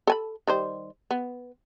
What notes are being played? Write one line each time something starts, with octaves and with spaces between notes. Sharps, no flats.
A4 G#5 B5
D#3 G3 C5
B3